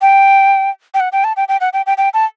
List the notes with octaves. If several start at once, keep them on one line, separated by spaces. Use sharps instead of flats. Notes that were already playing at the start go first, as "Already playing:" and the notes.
G5
G5
F#5
G5
A5
G5
G5
F#5
G5
G5
G5
A5